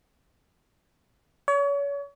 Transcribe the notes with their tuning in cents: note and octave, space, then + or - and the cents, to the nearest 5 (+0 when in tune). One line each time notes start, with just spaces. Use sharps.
C#5 +35